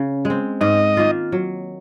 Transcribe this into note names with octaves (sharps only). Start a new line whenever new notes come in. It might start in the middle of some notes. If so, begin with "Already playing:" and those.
Already playing: C#3
G#3
C4
G#2 D#5
D#3 A#3 F4
F#3